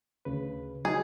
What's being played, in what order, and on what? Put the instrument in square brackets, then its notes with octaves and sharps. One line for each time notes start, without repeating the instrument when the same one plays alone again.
[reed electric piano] D2 C#3 B4
[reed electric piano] F#3 D#4 [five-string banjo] G#4